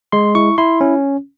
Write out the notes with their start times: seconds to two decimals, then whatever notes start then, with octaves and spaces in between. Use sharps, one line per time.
0.12 G#3 C6
0.35 E4 C#6
0.58 E4 C6
0.81 C#4